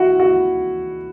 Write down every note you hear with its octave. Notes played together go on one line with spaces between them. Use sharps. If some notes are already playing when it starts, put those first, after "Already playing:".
Already playing: E4 F#4
F#4